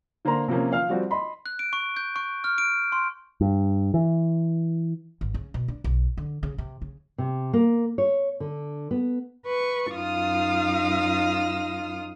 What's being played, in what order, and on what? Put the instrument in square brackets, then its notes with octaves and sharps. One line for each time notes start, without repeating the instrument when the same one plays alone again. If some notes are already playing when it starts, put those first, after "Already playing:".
[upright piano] D3 A#3 D4 C5 A#5 C6
C3 F3 A#3 C#4
F3 F5 F6
F3 G3 C4 F#4
D#5 B5 C6
[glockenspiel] F#6
D7
C#6
G6
C#6
F6
D7
C6
[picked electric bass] G2
E3
[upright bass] G#1
C#3
B2
D4
B1
D3
C#3
C3
C#3
[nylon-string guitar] C3
A#3
C#5
D3
B3
[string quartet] B4 C#6
F#2 D#4 F4 F5 D#6 F6